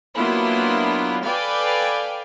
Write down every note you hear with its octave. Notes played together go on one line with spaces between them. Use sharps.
F#3 A#3 B3 D4 E4 F4
A4 B4 D5 F5 G5 G#5